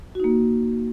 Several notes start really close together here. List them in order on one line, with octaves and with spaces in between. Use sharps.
F#4 D#4 A#3